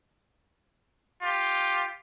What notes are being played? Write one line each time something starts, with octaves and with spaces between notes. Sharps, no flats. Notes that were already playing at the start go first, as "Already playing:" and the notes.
F4 G4